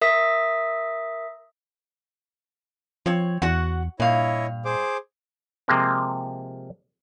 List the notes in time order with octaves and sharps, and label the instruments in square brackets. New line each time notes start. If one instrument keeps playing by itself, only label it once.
[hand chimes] A#4 E5 D#6 B6
[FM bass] F3 [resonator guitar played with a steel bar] C4 C#5
[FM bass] E2 [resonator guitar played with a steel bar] F#4 F#5
[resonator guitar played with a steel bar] G2 F5 [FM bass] A#2 [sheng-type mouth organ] E4 C#5 D#5
[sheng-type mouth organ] G#4 C5 D6
[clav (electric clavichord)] C3 F3 G#3 A#3 C4